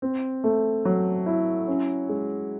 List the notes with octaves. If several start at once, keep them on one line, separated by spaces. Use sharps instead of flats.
C4
A3
F#3
E4
C#4
G#3